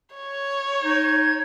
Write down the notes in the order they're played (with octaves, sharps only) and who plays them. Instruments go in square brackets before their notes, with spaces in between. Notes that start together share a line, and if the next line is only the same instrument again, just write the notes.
[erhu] C#5
[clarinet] D#4 [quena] G#6